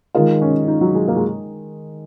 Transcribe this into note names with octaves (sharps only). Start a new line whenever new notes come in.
D#3 G#3 D#4 F4 A#4 D#5
C#4
D#4
F#3
G#3
A#3
G#3